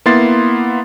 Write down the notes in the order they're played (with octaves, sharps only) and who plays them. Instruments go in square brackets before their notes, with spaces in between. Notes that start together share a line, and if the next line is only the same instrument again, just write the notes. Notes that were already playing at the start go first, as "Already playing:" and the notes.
[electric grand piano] A#3 B3 E4 C6 A6 C7